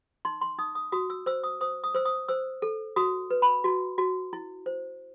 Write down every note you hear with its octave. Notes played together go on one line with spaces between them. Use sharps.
D#4 C6
C6
D#4 D#6
D#6
F#4 D#6
E6
C5 E6
D#6
C5 D#6
D#6
C5 E6
D#6
C5 E6
A4
F#4 D#6
B4
B5
F#4
F#4
E4
C5